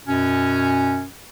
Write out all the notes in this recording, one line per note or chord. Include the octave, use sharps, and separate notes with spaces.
F#2 B2 C#4